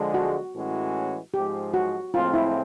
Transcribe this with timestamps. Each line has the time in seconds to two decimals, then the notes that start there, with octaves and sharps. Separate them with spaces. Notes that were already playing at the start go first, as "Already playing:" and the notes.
Already playing: D3 F3 G#3
0.14 F#4
0.55 A2 E3 G#3 C#4 F#4
1.34 G#2 F3 G#3 G4
1.74 F#4
2.14 A2 F3 G#3 C4 F4
2.34 E4